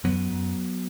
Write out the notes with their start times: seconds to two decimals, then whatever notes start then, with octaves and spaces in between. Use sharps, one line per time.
0.04 F#2 F#3 B3
0.30 F#2